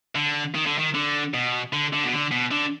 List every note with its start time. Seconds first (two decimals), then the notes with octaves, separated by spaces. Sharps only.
0.15 D3
0.55 D#3
0.66 D3
0.79 D#3
0.95 D3
1.34 B2
1.73 D3
1.93 D3
2.03 B2
2.12 D3
2.31 B2
2.51 D3